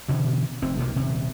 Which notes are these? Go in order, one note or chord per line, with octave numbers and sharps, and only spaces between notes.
G2 B2 D3 E3
F1 C4
B1 C3 E3 A#3
D#1 C3